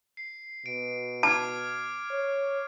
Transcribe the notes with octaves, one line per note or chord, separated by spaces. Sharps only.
C7
B2 D7
A5 D6 F6 G#6
C#5